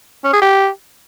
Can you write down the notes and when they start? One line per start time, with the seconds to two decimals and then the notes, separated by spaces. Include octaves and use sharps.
0.24 C#4
0.33 G#4
0.42 G4